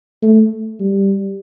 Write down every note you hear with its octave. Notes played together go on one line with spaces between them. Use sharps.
A3
G3